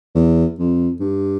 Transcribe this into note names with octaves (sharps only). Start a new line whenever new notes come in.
E2
F2
G2